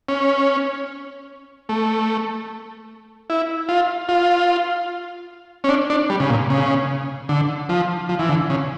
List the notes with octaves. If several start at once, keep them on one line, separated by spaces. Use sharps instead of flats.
C#4
A3
E4
F4
F4
C#4
D4
D4
G3
C#3
A#2
C#3
D3
F3
F3
E3
D3
C#3